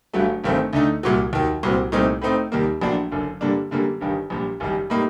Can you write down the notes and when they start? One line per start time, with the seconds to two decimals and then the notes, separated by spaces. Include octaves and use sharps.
0.13 G1 G2 F#3 A3
0.44 G1 G2 D#3 A3 C4
0.73 D2 D3 A3 D#4
1.03 C2 A#2 F#3
1.33 D#2 D#3 F#3
1.63 C2 A#2 F#3 C4
1.92 C2 A#2 A3 C4 D#4
2.22 A2 A3 C4 D#4
2.52 D#2 D#3 G3 A#3
2.81 A#1 A2 F#3 A#3 D4
3.12 F#1 F#2 D3
3.41 G2 D3 G3 A#3 D4
3.71 F#2 D3 G3 A#3
4.01 G1 G2 D#3 G3
4.30 A#1 A#2 G3
4.60 F#1 F#2 D#3 G3
4.90 A2 G3 A#3 D#4